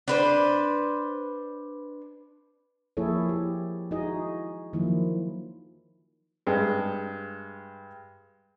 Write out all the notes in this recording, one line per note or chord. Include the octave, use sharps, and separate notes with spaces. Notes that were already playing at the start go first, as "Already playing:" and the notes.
D4 B4 C5
F3 A#3 E4 G#4 A4 C#5
G4
D#4 E4 F#4 G#4 D#5
D#3 F3 F#3 A#3 E4
G2 G#3